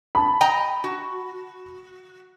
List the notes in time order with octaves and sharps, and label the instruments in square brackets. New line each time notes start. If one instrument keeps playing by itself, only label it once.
[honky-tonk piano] A5 B5
[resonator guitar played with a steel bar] D#5 G5 A#5
F#4